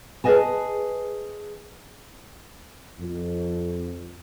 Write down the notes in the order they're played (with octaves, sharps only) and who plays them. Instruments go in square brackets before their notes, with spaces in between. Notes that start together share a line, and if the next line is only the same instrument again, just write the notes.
[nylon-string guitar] G#4 B4 C#5 D#5 G#5 A5
[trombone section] F2